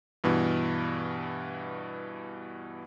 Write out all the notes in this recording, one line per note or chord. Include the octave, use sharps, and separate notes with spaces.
G2 B2 E3